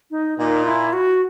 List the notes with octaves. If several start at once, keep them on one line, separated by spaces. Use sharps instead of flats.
D#4
A#2 D#4
E4
F#4